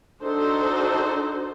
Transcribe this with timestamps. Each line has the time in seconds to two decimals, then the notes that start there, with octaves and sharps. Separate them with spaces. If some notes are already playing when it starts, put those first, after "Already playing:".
0.23 D4 D#4 F#4 A4 C5